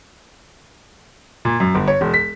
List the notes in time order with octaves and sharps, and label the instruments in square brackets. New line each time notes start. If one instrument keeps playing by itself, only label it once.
[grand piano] A#2
F#2
G1
C#5
E1
B6